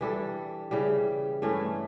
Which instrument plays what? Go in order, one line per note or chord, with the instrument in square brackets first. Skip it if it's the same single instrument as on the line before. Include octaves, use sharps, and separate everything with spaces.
[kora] E3 G3 D4 A4
C#3 E3 G3
G2 E3 A3 C#4